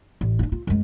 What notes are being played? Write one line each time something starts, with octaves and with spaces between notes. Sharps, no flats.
A1
D4 F4
F4
F#2 G#3